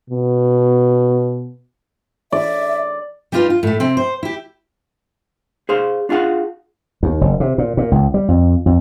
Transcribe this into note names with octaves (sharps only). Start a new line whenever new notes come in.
B2
D5 E5
G3 D4 D#4 F4 G4 B4
F4
A2 A3
C3 C4
C5
E4 G4
G#4 C5 F5
D4 F4 G#4 F5 F#5
D#2
F#1
C3
A#2
A#2
C#2
G3
F2
F2